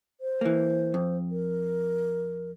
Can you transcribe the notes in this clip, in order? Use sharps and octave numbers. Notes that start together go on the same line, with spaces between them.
C5
E3 A#3
F2
A#4